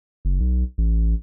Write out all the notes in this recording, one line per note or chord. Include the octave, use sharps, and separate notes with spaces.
F#1
B1
A1